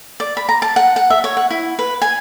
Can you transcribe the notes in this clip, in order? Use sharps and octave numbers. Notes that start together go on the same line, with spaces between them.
D5
B5
A#5
A5
F#5
F#5
E5
C#5
F#5
E4
B4
G#5